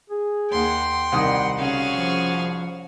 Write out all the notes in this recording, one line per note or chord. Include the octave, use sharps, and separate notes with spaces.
G#4
D#2 F#5 G5 C6
C2 D#3 G3 F#5 D#6
C#3 C#4 F#4 G#4 F5
F3